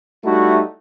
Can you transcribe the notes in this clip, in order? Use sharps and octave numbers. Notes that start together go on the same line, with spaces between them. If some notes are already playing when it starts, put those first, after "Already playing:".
G3 A3 D#4 E4 F#4